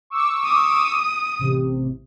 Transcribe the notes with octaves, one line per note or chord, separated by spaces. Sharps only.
C#6 D6 E6
D#6
A1 C3